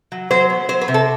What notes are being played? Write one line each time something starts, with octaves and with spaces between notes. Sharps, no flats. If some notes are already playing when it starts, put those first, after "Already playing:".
F#3
F#3 C5
B3
F#3 C5
B4
C3
A4